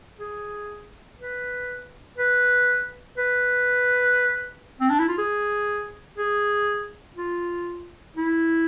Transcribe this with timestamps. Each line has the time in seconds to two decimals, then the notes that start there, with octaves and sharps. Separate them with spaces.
0.19 G#4
1.19 B4
2.18 B4
3.18 B4
4.81 C4
4.90 D4
4.99 E4
5.08 F4
5.18 G#4
6.18 G#4
7.17 F4
8.17 E4